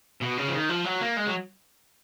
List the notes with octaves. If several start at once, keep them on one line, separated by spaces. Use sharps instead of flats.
B2
C#3
F3
D#3
F3
F#3
A#3
G#3
F#3